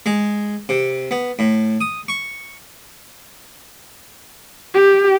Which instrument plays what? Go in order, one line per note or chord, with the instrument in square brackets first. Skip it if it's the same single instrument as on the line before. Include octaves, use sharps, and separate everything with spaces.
[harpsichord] G#3
C3
B3
A2
D#6
C#6
[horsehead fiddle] G4